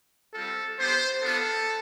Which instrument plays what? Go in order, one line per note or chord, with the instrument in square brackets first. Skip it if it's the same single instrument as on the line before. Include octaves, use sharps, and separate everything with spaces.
[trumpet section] G3 C4 F4 A4
B3 D4 G4 C5
B3 D4 F4 A4